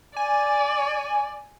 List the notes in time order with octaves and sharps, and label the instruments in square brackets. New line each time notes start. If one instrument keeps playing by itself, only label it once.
[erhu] D5 [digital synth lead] G#5